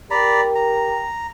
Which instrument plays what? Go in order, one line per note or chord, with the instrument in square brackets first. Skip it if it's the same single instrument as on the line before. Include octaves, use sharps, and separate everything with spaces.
[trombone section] G4 A#4 [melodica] D5 A#5 B5
[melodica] A#5